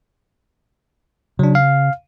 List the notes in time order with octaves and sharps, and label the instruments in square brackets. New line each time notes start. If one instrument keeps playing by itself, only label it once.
[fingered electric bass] C#3 [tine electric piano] F#3 D4
[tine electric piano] F5